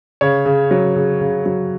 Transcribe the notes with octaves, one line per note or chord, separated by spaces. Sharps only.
C#3 C#5
C#3
F#3
C#3
C#3
F#3